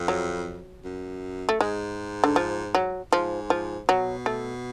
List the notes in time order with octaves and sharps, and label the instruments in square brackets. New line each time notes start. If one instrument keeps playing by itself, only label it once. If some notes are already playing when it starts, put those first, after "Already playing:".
Already playing: [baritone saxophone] F2
[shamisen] F#3
[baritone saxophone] F#2
[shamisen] A3
[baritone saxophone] G#2 [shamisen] G#3
[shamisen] D3
F3
F#3
[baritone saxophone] G#2 [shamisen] F3
[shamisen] F3
[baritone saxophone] B2 [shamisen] F#3
[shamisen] A3